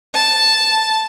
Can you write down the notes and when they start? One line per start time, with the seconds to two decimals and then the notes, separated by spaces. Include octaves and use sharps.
0.14 A5